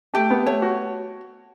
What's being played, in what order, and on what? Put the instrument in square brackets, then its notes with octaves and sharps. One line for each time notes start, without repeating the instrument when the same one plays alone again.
[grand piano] A3 [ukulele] G4
[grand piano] B3
[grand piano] A3 [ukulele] C#5
[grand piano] F#4